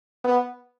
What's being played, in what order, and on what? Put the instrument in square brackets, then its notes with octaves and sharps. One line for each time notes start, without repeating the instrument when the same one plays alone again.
[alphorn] B3